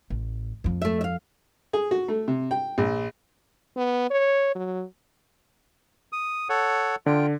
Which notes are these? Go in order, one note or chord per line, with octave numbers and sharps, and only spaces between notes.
A1
F2 F3
A3 E5
E5 F5
G#4
F#4
A3
C3
G5
A#1
B3
C#5
F#3
D#6
A4 C#5 F#5
D3 F4 G5